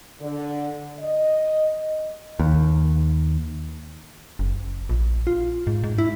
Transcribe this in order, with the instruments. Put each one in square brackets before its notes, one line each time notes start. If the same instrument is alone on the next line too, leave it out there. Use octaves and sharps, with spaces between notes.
[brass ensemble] D3
D#5
[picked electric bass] D#2
[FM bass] F#1
A#1
F4
G#2
G#2
E4